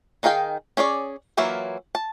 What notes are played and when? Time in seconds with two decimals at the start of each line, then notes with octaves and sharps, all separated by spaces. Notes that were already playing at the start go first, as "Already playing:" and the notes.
0.23 D#3 D#4 G#4 F5 G5
0.77 C#4 G#4 C#5 D5
1.37 E3 F#3 A#3 E4 F4
1.95 A5